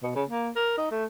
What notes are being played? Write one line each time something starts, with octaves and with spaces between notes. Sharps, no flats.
B2
C#3
A#3
A#4
D#4
A3